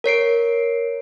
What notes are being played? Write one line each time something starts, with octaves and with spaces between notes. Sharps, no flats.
A#4 C#5 C7 D7